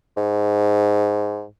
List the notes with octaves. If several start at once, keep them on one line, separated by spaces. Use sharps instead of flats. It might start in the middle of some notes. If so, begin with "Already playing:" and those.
G#2